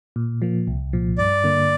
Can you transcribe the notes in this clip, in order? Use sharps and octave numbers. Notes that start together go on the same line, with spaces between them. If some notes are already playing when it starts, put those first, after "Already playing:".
A#2
F3 A#3
C2
A#2 F3
G2 D5
D3 A#3